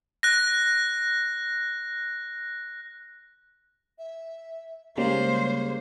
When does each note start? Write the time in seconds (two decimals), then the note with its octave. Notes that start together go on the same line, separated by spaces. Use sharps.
0.23 F#6 A#6
3.99 E5
4.97 C#3 G3 G#3 A#3 C5 C#5